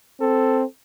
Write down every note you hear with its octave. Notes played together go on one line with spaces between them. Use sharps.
C4 A4